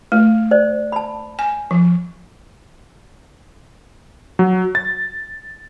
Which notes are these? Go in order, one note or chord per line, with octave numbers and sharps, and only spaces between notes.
A3
C5 D5
A5 B5
G#5
F3
F#3
A6